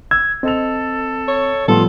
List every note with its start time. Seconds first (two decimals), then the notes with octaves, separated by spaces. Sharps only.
0.11 E6 G#6
0.43 C4 A4 D#5 F7
1.28 C#5
1.68 A2 F3 G3 B3 F4 A4